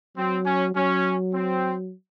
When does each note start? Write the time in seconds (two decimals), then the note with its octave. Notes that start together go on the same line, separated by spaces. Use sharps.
0.18 F#3 C4
0.46 C#4
0.76 F#3 C#4
1.33 C4